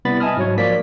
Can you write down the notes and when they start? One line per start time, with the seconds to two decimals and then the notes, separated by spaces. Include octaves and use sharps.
0.05 C3 G3 B3 E4 B5 A6
0.20 D#5 E5 G#5 A5 D#6 F6
0.37 G#2 F#3 C#5
0.58 F3 A#3 D5 B6